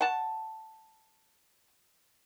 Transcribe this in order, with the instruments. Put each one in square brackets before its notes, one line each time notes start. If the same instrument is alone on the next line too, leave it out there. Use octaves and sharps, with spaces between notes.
[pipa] F#5 A5